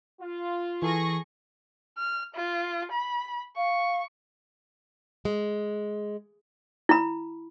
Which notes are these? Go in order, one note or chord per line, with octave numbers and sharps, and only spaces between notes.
F4
E3 G#4 A4 C#6 A#6
F6
F4
B5
F5 C#6
G#3
E4 B5